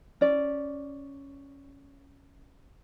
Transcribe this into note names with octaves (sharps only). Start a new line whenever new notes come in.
C#4 D5